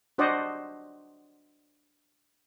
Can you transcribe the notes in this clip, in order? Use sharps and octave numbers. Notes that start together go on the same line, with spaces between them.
D4 F#4 C5 D5 D#5 F#5